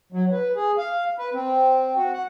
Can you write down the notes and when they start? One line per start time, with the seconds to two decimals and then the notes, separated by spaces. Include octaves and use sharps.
0.12 F#3
0.32 B4
0.56 G#4
0.78 F5
1.18 B4
1.34 C4
1.96 F#4
2.13 F#5